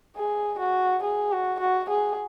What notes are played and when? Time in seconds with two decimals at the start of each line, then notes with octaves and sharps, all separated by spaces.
0.16 G#4
0.59 F#4
1.03 G#4
1.32 F#4
1.60 F#4
1.90 G#4